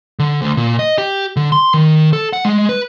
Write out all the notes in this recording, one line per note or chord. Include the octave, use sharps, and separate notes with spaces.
D3
D2
A#2
D#5
G4
D3
C6
D#3
A4
F#5
G#3
B4